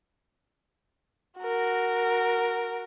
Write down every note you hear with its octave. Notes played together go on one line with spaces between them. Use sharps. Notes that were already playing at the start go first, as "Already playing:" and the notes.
F#4 A#4